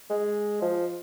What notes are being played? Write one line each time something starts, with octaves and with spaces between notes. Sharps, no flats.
G#3
F3